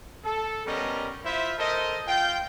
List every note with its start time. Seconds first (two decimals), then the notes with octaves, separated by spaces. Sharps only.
0.24 A4
0.66 G3 B3 C#4 A#4 D#5
1.24 E4 F4 C5 E5
1.58 A4 A#4 C5 D#5
2.08 F4 F5 G5